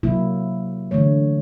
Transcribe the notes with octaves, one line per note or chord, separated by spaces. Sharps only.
C3 F#3 A#3 E4
D3 E3 A3 C#5